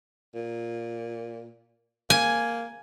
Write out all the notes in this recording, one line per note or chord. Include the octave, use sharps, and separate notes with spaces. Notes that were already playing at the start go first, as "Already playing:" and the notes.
A#2
A#3 G#5